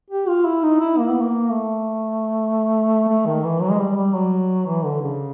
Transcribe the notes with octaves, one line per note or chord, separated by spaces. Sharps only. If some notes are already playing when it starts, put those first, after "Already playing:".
G4
F4
E4
D#4
E4
A#3
B3
A#3
A3
A3
D#3
E3
F#3
G#3
G3
G3
F#3
E3
D3
C#3